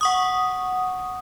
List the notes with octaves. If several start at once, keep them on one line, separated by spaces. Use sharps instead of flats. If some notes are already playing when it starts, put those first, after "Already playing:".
F#5 C#6 D#6